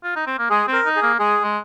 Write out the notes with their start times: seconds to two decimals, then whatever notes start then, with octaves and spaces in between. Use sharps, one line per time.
0.03 F4
0.15 D#4
0.27 C4
0.38 A#3
0.50 G#3 G#4
0.67 C4
0.73 A#4
0.85 D#4
0.96 G#4
1.02 A#3
1.19 G#3 G#4
1.42 G#3